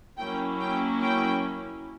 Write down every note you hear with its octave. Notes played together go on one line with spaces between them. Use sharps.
F#3 A#3 C#4 E4 G5
G5
G5